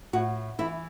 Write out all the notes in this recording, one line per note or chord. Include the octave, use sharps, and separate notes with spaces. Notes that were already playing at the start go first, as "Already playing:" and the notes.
A2 F#4
E3 E4